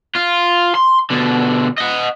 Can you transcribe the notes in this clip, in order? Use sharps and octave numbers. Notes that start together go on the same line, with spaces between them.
F4
C6
B2 D3
D#5 F#5